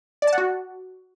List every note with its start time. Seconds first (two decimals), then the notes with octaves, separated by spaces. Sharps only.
0.22 D5
0.27 A5
0.33 F#5
0.38 F#4